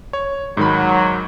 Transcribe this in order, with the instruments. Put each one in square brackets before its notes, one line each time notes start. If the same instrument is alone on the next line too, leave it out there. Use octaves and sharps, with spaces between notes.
[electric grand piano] C#5
[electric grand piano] G#2 D#3 B5 [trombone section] F#3